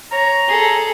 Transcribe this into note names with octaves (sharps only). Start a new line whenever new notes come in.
C#5 A#5
G#4 A4